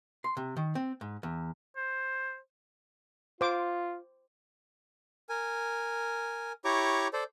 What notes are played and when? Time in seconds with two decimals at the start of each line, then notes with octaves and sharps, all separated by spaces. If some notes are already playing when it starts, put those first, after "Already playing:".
0.24 C6
0.37 C3
0.57 D#3
0.75 C4
1.01 G#2
1.23 E2
1.76 C5
3.41 F4 C5 D6
5.29 A#4 G#5
6.65 E4 G4 C#5 A#5 C#6 D6
7.13 A4 C5 D5